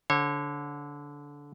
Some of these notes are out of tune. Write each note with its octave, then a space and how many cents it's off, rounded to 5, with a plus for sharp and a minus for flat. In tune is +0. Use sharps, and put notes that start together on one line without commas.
D3 -20 C#5 -30